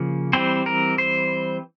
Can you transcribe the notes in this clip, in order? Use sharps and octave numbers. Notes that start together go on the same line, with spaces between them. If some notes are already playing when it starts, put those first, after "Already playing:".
Already playing: C#3 F3 A#3
E3 G3 C4 C5
A#4
C5